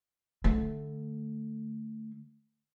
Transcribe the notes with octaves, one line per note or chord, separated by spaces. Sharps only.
D3 A3